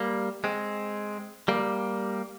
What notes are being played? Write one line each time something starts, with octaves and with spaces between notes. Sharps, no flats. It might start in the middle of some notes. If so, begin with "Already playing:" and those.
Already playing: G3 A#3
G#3 C4
G3 A#3